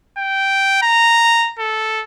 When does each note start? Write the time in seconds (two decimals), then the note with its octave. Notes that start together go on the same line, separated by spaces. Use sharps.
0.18 G5
0.82 A#5
1.59 A4